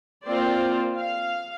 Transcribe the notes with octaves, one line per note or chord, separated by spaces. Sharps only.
A#3 C4 F4 C5 D5
F5